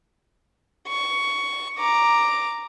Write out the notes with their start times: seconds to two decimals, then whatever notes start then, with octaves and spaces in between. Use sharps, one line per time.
0.88 C#6
1.79 A#5 D6